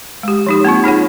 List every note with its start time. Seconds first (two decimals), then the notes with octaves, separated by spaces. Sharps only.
0.23 G#3 G4
0.46 F3 D#4 G4
0.64 A#3 C4 F4
0.84 D#4 G#4 C#5 F#5